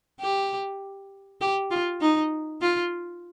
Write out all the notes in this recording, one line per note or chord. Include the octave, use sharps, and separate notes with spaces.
G4
G4
F4
D#4
F4